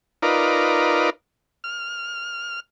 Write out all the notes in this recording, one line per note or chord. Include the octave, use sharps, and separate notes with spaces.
D#4 F4 A#4 B4 D5
F6